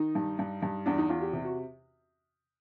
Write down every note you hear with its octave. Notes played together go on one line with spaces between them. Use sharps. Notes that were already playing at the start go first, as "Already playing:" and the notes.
Already playing: D#3 D#4
G2
G2
G2
E2 D4
D#4
E2 F4
G4
C3 G4
F#4